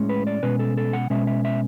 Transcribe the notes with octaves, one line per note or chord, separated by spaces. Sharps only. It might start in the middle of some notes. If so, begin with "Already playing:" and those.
Already playing: A2 G#3 C#4
B4
D5
B2 G#3 C#4 B4
A4
A4
F#5
B2 G#3 C#4 E5
E5
E5